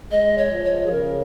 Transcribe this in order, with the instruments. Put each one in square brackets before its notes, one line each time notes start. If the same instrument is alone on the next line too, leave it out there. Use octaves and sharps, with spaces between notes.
[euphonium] G#3 [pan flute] D#5
[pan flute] C#5
[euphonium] F3
[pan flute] C#5
G#4
[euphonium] C#3 [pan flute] A#4